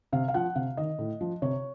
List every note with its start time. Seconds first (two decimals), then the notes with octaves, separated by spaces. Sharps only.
0.13 C3 F5
0.28 F5
0.34 F3 F#5
0.55 C3 F5
0.77 D#3 D#5
0.99 A2
1.21 F3
1.42 C3 C#5